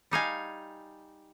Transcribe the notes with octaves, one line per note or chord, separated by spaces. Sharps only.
G3 D#4 F5 G#5